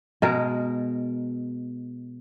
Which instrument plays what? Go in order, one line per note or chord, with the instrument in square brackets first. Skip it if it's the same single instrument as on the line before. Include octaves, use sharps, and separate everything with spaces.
[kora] B2 G#3 A#4